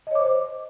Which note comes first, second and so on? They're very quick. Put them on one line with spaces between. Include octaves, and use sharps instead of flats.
D#5 C#5 D6 C5